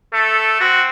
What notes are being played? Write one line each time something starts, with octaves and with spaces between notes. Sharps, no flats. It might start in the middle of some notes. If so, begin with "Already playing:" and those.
A3 A4
C4 F#4